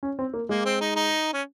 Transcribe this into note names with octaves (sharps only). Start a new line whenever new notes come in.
C#4
C4
A#3
G#3 A#3
C4
D#4
D#4
C#4